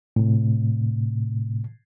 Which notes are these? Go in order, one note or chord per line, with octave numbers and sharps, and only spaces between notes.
A2 C3